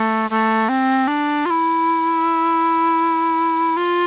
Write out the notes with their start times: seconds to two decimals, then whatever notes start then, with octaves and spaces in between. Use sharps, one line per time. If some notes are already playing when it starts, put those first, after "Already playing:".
Already playing: A3
0.30 A3
0.69 C4
1.07 D4
1.46 F4
1.50 E4
3.77 F4